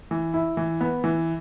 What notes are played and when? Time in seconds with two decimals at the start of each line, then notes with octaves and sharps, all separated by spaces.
0.11 E3
0.34 E4
0.57 E3
0.81 B3
1.04 E3